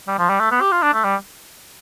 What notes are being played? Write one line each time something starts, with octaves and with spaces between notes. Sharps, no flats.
G3
F3
G3
A3
B3
G4
F4
D4
A3
G3